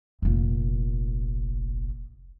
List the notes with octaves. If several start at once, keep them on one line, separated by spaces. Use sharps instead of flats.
F1 A#1